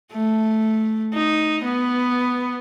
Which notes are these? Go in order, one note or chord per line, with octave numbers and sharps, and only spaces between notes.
A3
D#4
B3